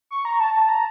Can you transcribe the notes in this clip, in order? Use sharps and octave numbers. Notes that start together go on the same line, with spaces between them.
C#6
A#5
A5
A5
A#5